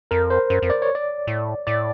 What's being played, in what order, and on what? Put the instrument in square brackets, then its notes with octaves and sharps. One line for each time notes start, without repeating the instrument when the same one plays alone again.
[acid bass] F2 [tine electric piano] A#4
[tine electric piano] C5
[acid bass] F#2
F2
[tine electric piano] D5
C#5
D5
[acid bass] A2
[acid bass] A2 [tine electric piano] D5